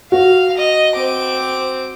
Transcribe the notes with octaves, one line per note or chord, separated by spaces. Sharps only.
F#4 F5
D#5
C4 D6